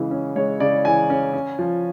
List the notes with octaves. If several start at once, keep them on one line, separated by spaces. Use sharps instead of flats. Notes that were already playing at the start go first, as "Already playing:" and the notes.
Already playing: C#3 E3 G#3
C#4
G#3 C#5
C#3 D5
E3 G#5
C#4
C#4
F3